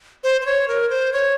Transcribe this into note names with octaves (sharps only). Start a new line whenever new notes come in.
C5
C5
C#5
A#4
C5
C#5